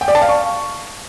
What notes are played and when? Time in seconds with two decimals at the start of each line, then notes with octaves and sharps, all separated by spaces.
0.01 G5
0.08 D5
0.15 A5
0.22 F5
0.29 C#6